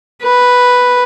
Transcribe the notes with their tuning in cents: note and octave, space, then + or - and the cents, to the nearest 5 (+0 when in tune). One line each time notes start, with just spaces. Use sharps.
B4 +0